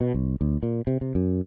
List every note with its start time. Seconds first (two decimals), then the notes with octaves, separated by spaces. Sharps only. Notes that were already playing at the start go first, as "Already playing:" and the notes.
0.01 B2
0.14 C2
0.41 D2
0.63 A#2
0.87 C3
1.01 C3
1.15 F#2